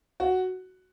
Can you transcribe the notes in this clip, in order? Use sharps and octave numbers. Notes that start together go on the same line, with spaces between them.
F#4